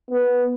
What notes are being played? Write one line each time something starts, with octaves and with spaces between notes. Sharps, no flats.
B3